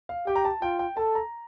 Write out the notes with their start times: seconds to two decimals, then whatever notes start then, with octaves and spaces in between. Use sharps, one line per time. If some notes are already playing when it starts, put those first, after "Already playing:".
0.09 F5
0.27 G4 G5
0.36 A#5
0.45 A5
0.62 F4 G5
0.79 G5
0.97 A4 A5
1.15 A#5